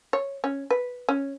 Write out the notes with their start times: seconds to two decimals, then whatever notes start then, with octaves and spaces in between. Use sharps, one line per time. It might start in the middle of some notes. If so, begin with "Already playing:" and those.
0.13 C#5
0.44 C#4
0.71 B4
1.09 C#4